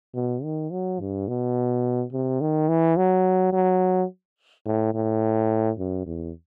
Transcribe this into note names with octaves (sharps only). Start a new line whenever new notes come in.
B2
D#3
F#3
G2
B2
C3
D#3
E3
F#3
F#3
A2
A2
F#2
E2